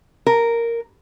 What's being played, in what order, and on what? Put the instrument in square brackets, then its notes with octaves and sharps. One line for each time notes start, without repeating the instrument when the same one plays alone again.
[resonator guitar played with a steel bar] A#4